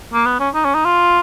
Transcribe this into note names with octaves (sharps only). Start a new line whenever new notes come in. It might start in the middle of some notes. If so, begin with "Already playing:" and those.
A#3
B3
C#4
D#4
C#4
D#4
F4